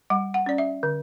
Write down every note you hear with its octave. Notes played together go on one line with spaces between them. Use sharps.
G3 F#5
F#5
C#4 D5
E5
D3